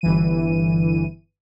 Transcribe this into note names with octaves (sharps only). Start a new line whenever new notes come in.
G1 E3 D#7